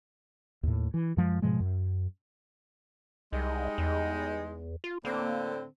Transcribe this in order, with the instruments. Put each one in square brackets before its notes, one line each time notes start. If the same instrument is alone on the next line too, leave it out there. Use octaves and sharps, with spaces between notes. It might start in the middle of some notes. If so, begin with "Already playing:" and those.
[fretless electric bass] D#2 A2
E3
F#2 F3 G#3
G#2 B2 F3 G#3
F#2
[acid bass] C2 [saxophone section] G3 G#3 D#4
[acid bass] E2
F4
[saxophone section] A2 D3 C4 [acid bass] A#3